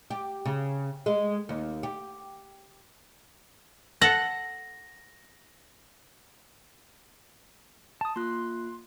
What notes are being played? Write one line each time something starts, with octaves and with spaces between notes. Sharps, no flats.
G4
C#3
G#3
D#2
G4
A4 F#5 A#6
A5 D#6
A#3 F4 C6 F#6